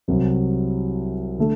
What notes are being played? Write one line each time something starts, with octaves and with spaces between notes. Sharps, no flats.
C2 C3 F#3
D3 A3